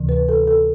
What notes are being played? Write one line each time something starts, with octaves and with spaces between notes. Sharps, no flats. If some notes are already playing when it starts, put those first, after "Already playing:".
Already playing: D2 C3 E3
B4
A4
A4